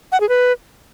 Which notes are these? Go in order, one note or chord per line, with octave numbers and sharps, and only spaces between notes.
F#5
G#4
B4